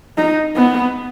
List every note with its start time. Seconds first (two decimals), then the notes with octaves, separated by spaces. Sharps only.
0.18 D#4
0.56 B3